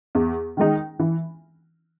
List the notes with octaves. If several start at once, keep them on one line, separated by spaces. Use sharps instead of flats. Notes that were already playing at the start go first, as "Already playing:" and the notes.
E2
D#3 G#3 D#4
E3